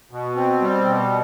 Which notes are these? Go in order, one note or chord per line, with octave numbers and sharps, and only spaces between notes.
B2
C4
G3
B2